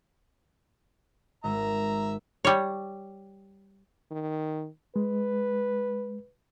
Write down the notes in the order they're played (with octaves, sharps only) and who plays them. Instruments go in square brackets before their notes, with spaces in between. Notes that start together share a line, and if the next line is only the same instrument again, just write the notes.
[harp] G#1 G#3 [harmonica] E5 A#5
[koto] G3 C#5
[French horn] D#3
[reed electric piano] G#3 [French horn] B4